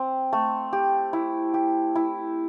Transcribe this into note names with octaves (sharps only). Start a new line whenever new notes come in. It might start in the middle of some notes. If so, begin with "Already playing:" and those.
Already playing: C4
A3
G4
E4
G4
E4